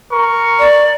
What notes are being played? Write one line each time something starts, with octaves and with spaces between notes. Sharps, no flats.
A#4 C#6
D5